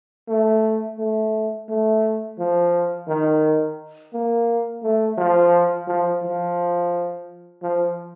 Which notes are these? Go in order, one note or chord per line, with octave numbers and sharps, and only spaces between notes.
A3
A3
A3
F3
D#3
A#3
A3
F3
F3
F3
F3